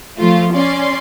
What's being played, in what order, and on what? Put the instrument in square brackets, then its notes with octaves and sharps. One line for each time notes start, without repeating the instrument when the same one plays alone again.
[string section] F3 A3 F4
C#4 D5 C6